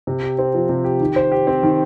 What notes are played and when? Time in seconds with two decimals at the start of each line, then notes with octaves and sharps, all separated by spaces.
0.07 C3
0.23 G4
0.39 C4
0.54 F3
0.69 C3
0.84 G4
1.01 D#3
1.16 C5
1.32 G4
1.47 C4
1.63 D#3